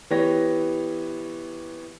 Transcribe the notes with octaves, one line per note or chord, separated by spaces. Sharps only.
E3 B3 G4 C#5 A#6